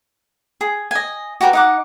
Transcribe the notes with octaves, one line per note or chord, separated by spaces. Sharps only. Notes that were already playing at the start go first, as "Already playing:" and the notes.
G#4
D#5 G#5
F#4 G4 A#4 B4
D#4 F#5 D6